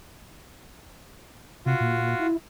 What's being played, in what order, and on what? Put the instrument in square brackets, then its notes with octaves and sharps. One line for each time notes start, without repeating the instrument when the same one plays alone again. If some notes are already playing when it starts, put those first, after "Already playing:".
[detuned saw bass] C3 [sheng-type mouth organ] F4 F#4
[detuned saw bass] A#2
E4